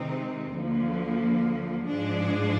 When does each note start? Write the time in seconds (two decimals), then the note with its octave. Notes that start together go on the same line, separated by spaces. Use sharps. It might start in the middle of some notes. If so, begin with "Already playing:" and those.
Already playing: C3 D#3 G#3 C4 D#4
0.56 D2 D3 F3 A#3
1.87 G#2 F3 G#3 D4 G#4